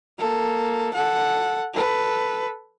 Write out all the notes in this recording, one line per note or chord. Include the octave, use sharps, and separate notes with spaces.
A#3 A4
A4 F#5
A4 B4